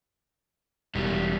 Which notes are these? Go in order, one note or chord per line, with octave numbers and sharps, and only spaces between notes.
E1 E2 G3